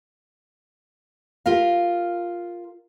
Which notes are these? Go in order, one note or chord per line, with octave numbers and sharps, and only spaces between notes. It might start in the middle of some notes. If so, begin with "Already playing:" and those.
F4 G4 A#4 F5